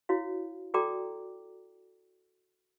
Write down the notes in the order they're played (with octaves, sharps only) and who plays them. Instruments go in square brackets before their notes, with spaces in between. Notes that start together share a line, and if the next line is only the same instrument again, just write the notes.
[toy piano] E4 F#4 C#5 F5
F#4 A4 D5 G5 A#5 D6